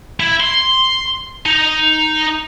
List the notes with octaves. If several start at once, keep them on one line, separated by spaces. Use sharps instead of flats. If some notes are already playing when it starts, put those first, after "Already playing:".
E4
C6
D#4